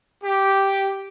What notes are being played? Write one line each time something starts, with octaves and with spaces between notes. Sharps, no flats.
G4